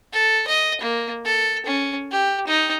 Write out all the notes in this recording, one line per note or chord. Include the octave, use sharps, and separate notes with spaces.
A4
D#5
A#3
A4
C#4
G4
D#4